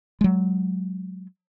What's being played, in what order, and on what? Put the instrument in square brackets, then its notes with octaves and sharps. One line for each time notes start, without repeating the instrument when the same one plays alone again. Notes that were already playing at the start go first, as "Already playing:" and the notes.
[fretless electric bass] F#3 G#3